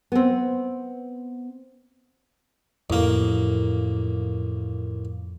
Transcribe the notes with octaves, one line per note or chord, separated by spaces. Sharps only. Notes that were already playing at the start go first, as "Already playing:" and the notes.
B3 C4
A1 F2 A#3